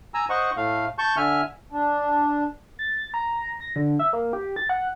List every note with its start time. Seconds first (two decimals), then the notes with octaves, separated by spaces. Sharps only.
0.14 G#5 A#5 E6
0.30 C5 D#5 F#5 C#6
0.57 A2 A3 F5
0.98 A5 C#6 G6
1.17 D3 E5 G#5 F6
1.72 D4
2.79 A6
3.14 A#5
3.60 A#6
3.76 D3
3.99 E5
4.13 A#3
4.33 G4
4.56 A6
4.69 F#5